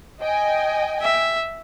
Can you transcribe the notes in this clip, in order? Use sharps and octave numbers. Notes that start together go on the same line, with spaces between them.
D#5 G5 G#5
E5